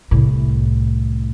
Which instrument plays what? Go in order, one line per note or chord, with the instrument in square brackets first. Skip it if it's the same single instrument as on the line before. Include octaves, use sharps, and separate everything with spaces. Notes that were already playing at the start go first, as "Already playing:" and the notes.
[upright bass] C2 A2